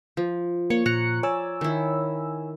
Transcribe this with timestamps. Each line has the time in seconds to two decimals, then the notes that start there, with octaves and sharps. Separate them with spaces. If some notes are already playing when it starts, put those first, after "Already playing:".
0.17 F3
0.70 A#3 C#5 C#7
0.86 A#2 A#5 F#6 C#7
1.23 C#5 D5 G#5 E6
1.61 D#3 E4